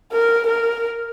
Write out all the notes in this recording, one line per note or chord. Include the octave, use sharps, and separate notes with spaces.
A#4
A#4